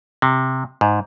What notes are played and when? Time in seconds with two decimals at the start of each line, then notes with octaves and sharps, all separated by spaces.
0.22 C3
0.81 G#2